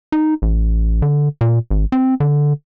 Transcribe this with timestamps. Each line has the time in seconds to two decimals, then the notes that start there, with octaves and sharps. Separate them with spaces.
0.12 D#4
0.42 A1
1.02 D3
1.41 A#2
1.70 G#1
1.92 C4
2.20 D3